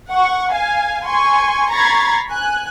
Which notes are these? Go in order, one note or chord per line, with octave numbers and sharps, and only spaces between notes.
F#5 C#6
F5 G#5
G#5 C6 C#6
A#5 B5 C#6 G#6 A6 C7
G#5 F#6